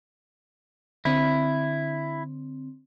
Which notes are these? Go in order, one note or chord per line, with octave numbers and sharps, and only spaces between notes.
D3 C4 E4